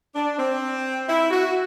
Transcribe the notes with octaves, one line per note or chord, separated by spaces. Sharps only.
D4
C4
E4
F#4